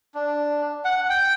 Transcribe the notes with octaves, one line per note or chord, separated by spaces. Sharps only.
D4
F#5
G5